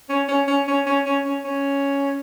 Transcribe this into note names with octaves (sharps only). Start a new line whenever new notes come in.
C#4
C#4
C#4
C#4
C#4
C#4
C#4
C#4